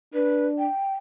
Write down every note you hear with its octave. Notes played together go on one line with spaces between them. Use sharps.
D4 B4
G5